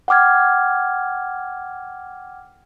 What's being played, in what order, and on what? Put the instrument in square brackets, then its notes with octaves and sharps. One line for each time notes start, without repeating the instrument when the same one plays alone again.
[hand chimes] F#5 G5 D6 F6 G#6